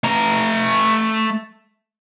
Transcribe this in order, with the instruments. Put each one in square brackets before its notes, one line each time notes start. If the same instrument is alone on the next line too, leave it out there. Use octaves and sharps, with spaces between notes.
[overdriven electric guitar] A3 A#5